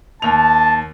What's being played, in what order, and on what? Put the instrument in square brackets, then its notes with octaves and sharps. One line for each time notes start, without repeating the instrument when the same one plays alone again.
[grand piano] D#2 F7 [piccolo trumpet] A5